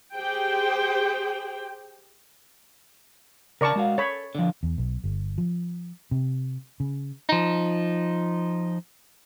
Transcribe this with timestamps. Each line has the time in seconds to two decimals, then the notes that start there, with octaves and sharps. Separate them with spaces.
0.15 G4 G#4 C5 G5
3.61 C#3 A#4 D5 A5 C#6
3.76 G#3 F#4 F5
3.98 A4 C#5 B5
4.35 D3 F3
4.63 E2
4.78 B1
5.04 G1
5.38 F3
6.11 C3
6.80 C#3
7.29 F3 D#4